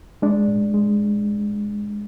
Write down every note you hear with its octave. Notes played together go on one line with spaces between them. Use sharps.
G#3 D4
A2
G#3